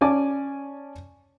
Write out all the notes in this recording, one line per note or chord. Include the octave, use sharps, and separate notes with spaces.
C#4 D5 G#5 A5 D6